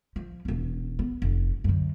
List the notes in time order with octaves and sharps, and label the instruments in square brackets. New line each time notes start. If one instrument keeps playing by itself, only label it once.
[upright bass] F3
E1 C#4
B3
F1
F#2 D3